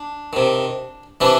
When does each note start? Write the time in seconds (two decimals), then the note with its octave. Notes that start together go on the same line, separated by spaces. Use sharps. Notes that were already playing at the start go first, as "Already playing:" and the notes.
Already playing: D4
0.33 C3 D#3
1.21 C3 E3 D4 E4